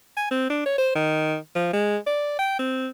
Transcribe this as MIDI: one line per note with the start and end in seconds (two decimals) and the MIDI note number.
0.17 0.27 80
0.31 0.50 60
0.50 0.61 62
0.66 0.77 73
0.78 0.92 72
0.95 1.36 51
1.56 1.73 53
1.74 1.97 56
2.07 2.38 74
2.39 2.56 79
2.59 2.89 60